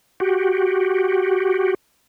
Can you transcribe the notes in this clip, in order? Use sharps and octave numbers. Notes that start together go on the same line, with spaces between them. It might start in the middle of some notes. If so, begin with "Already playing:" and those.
F#4 G4